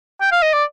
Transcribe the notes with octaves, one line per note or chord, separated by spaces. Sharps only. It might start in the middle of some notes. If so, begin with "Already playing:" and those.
G5
F5
D#5
D5